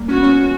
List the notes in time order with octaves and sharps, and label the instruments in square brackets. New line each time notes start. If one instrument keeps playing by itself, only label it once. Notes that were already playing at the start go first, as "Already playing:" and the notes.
Already playing: [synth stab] G3 A#3
[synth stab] C#4 [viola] F#4
[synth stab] B3
C#4